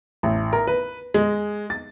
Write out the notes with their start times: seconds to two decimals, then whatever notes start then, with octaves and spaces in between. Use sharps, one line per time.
0.23 A1
0.53 A#4
0.67 B4
1.14 G#3
1.70 A6